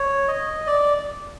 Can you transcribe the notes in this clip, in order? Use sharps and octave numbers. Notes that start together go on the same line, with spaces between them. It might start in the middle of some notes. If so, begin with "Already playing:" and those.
Already playing: C#5
D#5
D5